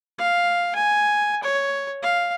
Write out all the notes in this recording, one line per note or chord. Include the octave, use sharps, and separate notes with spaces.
F5
G#5
C#5
F5